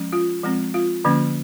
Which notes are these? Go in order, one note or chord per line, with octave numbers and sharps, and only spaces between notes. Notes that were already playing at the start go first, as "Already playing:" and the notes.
Already playing: F3 G#3 C#4
F4
F3 G#3 C4
F4
D3 F3 A#3 C#4